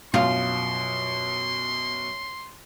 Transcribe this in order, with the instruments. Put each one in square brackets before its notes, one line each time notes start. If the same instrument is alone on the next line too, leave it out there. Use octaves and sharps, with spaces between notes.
[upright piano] F#2 B2 [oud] F4 [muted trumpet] C6